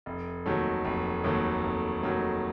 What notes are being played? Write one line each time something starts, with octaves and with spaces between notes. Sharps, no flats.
F1
D#2 D#3 F#3 A3
F1
D#2 D#3 F#3 A3
F1
D#2 D#3 F#3 A3